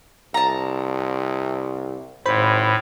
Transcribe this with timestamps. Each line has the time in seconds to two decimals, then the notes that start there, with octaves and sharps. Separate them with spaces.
0.34 C2 A5 A#5
2.26 G#1 A2 C5 B5